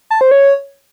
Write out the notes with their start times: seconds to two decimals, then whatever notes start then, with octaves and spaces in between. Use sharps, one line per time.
0.11 A5
0.21 C5
0.31 C#5